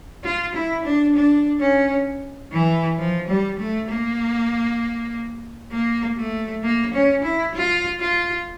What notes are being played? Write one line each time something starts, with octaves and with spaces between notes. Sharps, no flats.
F4
E4
D4
D4
C#4
E3
F3
G3
A3
A#3
A#3
A3
A#3
C#4
E4
F4
F4